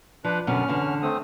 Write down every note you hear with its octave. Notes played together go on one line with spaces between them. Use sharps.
F3 D4 B4
F#2 B2 D3 C#4 F6
E2 D3
A3 C4 D#6